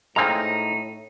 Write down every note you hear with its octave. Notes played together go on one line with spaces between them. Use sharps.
A2 G#3 A#3 C4 D#4 A#5